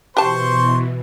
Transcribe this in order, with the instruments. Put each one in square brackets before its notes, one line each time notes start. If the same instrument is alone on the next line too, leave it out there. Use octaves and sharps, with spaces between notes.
[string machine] B2 E3 [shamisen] G4 A5 [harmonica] C5 C6 C#6